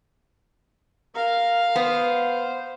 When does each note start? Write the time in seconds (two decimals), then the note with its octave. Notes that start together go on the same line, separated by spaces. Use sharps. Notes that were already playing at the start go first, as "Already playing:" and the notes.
1.15 A#4 F5
1.76 B3 C5